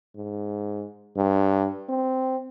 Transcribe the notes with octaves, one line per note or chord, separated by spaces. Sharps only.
G#2
G2
C4